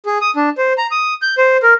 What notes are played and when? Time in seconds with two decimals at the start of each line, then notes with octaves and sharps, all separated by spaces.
0.06 G#4
0.21 D#6
0.36 D4
0.58 C5
0.78 A#5
0.91 D#6
1.22 G6
1.38 C5
1.63 A#4